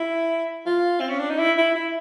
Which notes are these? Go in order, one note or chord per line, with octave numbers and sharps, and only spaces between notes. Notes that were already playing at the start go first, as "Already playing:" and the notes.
Already playing: E4
F4
C4
C#4
D4
D#4
E4
E4
E4